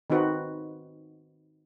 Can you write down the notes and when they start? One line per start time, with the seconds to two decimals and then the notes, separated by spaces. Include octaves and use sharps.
0.10 D#3 C4 D#4 F#4 B4